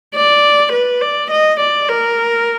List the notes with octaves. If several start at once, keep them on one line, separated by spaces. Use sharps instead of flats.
D5
B4
D5
D#5
D5
A#4